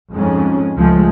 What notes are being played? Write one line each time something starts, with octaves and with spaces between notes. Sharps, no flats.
F2 G#2 G#3 C#4
C#2 F3 G#3 A3